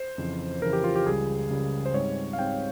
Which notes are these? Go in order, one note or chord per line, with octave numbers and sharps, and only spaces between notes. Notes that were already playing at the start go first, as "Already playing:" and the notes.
Already playing: C5
F2 C#3 E3
F2 C#3 E3 A#4
G4
F4
G4
C#2 C#3 G3 G#4
C#2 C#3 G3
C5
G#2 G3 C4 C#5
F5
G#2 G3 C4 G5